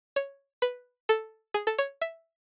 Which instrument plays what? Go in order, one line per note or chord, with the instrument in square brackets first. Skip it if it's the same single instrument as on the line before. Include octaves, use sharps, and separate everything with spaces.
[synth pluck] C#5
B4
A4
G#4
A4
C#5
E5